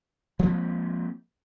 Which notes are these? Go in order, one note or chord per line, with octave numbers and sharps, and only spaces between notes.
F3 G#3 A#3 C4